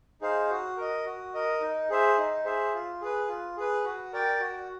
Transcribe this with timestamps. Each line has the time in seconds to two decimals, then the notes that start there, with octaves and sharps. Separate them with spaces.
0.21 D#4 G#4 C5 F5
0.50 F#4
0.77 A#4 D#5
1.06 F#4
1.34 A#4 D#5
1.61 D#4
1.90 G#4 C5 E5
2.18 D#4
2.45 G#4 C5 E5
2.74 F4
3.01 G#4 B4
3.28 F4
3.57 G#4 B4
3.84 F#4
4.13 A#4 D5 G5
4.40 F#4